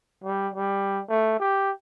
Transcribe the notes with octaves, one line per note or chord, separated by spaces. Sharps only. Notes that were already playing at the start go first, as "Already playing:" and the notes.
G3
G3
A3
G4